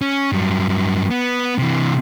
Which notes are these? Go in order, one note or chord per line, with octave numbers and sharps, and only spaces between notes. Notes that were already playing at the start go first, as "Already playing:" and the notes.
C#4
G2 F#3
B3
C3 E3